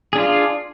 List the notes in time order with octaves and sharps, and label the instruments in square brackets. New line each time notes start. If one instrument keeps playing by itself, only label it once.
[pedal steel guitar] G#4
D4
F4